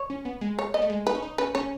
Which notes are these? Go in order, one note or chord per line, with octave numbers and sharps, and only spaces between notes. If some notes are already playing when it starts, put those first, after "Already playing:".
Already playing: C#5
C#4
B3
G#3
C#5
B3 D#5
A3
G#3
D#4 B4
C#4
D#4
C#4 B4
C#4 C#5